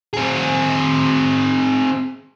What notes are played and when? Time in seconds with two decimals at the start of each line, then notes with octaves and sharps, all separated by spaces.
0.13 C4 G#4